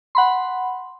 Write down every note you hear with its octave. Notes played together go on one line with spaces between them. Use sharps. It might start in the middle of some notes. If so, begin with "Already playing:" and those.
F#5 B5 C6